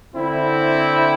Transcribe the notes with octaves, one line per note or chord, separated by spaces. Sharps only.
D3 C4 E4